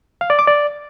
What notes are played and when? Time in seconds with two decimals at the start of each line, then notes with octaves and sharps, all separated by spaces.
0.21 F5
0.30 D5
0.39 D6
0.48 D5